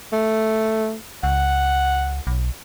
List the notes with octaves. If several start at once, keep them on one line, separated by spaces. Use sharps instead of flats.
A3
C#2 F#5
B1